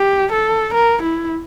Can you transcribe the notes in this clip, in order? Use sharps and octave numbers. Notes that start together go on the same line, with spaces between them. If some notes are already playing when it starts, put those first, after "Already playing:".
Already playing: G4
A4
A#4
E4